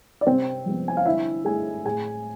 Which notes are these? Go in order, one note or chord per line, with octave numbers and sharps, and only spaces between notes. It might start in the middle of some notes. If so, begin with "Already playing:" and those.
D5
C3 C4 C5
F3 G#3 B3
G#5
F5
D3 E4 E5
A3 G#4 G#5
A2 G#4 G#5